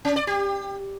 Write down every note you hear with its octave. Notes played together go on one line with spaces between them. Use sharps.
C#4
D5
G4